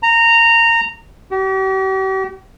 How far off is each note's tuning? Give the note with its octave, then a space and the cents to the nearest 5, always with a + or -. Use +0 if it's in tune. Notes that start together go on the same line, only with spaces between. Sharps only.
A#5 -15
G4 -45